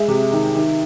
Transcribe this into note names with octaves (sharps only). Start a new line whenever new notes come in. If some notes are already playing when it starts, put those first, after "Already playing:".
Already playing: G#3 E5
C3
D#3
D#3